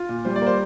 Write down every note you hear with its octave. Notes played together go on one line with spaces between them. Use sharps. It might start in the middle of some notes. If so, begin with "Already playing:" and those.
Already playing: F4
A#2
G3 C5
D5
A#3
C5